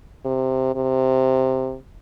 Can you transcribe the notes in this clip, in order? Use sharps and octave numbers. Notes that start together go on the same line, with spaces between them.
C3
C3